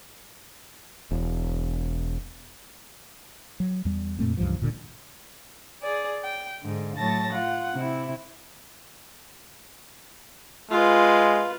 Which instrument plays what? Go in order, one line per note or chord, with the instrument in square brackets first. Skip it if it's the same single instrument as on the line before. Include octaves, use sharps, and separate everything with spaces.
[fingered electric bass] E1
[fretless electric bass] F#3
E2 G3
F2 A#2 A3 C4
C#2 G2 E3 F3
D1 A#2 D3
[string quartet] G#4 D5
G5
G#2 D3
A2 F#3 A5 A6 A#6
F4 F#5
C3 E4
[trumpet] G#3 [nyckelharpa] F4 B4